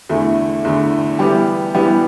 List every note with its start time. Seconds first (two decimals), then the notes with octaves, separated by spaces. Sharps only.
0.09 E2 D3 A3 E4
0.65 E2 D3 A3 E4
1.19 E3 G3 B3 G4
1.74 E3 G3 B3 G4